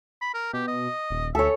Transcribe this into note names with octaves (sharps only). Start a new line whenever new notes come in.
B5
A#4
B2 G4
D#5
D#1
D2 A4 C#5 E5